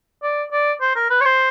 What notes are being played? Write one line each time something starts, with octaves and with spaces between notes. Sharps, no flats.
D5
D5
C5
A#4
B4
C#5
C5